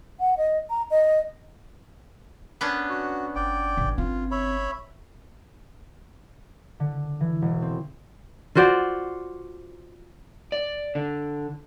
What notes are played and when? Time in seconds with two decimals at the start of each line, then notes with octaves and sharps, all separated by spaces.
0.20 F#5
0.37 D#5
0.70 A#5
0.91 D#5
2.61 B3 C#4 D4
2.89 F#4
3.35 G1 D5 G5
3.77 A1
3.98 C4 F4
4.31 C#5 E5 B5
6.80 D3
7.20 E3
7.42 E1
7.62 C4
8.55 F4 F#4 C5 D5
10.52 D5
10.95 D3